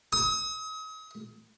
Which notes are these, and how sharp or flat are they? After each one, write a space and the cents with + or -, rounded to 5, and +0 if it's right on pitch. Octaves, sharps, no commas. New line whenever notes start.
D#6 +40